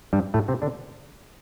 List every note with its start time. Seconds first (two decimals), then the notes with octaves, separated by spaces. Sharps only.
0.13 G2 G3
0.34 A2 A3
0.48 C3 C4
0.62 D3 D4